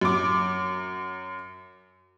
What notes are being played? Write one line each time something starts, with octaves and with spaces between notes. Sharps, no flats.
F#2 D6